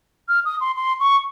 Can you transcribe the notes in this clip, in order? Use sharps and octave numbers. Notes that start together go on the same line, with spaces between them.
F6
D#6
C6
C6
C#6